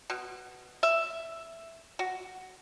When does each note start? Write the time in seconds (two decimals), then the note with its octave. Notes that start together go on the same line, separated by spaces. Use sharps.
0.10 B2
0.83 E5
1.99 F#4